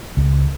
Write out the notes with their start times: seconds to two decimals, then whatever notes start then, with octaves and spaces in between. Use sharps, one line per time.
0.17 C#2